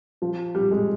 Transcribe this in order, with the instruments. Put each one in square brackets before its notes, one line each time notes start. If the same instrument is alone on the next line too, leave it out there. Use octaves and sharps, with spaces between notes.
[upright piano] F3
G3
G#3